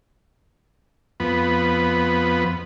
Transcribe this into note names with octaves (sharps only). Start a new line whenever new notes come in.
F2 B3